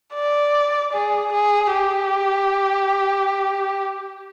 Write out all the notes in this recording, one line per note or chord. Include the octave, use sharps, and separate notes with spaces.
D5
G#4
G#4
G4